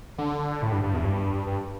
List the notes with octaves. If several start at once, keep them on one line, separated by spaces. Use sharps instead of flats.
D3
A2
G2
G2
E2
G2
G2